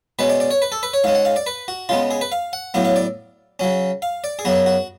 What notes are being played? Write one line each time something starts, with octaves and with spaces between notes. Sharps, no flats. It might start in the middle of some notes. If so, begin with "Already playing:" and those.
B2 G#3 C#4 B4
D5
D5
C#5
B4
A4
B4
C#5
G#2 G#3 C#4 F5
F#5
F5
D5
B4
F#4
C#3 G#3 B3 F4
G#4
B4
F5
F#5
A2 F#3 B3 F5
F5
D5
C#3 F#3 C#4
F5
D5
G#4
F#2 C#3 F#3 B3 F#4
F#4